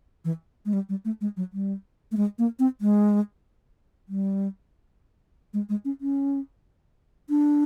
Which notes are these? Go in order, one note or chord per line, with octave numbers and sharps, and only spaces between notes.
E3
G#3
G3
G3
A3
G#3
F#3
G3
A3
G#3
A#3
C4
G#3
G3
G#3
G#3
C#4
C#4
D4